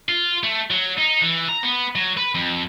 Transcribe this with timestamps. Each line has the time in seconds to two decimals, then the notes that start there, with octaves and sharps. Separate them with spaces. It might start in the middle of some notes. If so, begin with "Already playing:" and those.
0.09 F4
0.44 A3
0.70 F#3
0.97 D#4
1.21 E3
1.49 A#5
1.63 B3
1.95 F#3
2.17 B4
2.35 F2